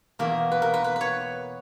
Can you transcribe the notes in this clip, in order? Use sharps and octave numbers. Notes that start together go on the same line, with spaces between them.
E2 B2 A#3 A#4
B4
A#4
B4
B4
B4 C#5